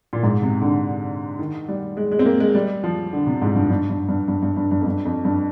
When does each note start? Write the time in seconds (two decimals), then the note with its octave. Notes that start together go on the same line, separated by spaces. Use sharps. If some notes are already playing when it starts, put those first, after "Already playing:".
0.13 A#2
0.23 G#2
0.42 C3
0.62 D3
1.39 D#3
1.68 G3
1.97 G#3
2.12 G#3
2.19 C4
2.26 A#3
2.40 G#3
2.55 G3
2.84 F3
3.13 D3
3.27 C3
3.42 G#2
3.56 G2
3.70 G2
3.89 G2
4.08 G2
4.28 G2
4.42 G2
4.57 G2
4.71 G2
4.81 F2
4.86 G2
5.05 F2
5.25 G2